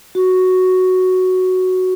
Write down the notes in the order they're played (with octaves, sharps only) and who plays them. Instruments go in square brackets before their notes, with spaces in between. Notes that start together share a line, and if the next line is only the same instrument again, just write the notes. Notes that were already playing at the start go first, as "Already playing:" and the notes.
[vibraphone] F#4